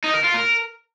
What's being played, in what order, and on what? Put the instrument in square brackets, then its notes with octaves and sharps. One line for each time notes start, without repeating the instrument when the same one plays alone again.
[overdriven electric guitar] D#4
A#4
F4
A#4